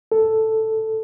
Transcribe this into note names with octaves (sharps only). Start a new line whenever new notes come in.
A4